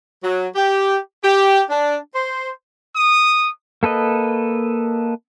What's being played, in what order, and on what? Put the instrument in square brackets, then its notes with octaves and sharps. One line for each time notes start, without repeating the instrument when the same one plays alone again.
[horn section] F#3
G4
G4
D4
C5
[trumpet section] D#6
[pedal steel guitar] A#3 A4 B4 D#5